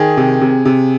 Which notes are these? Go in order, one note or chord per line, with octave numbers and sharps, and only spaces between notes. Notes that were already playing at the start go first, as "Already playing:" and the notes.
Already playing: D#3 G#4
C3
C3
C3